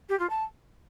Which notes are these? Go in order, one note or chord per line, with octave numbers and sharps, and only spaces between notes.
G4
F4
A5